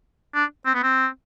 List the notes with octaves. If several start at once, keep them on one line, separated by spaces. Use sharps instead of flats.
D4
C4
B3
C4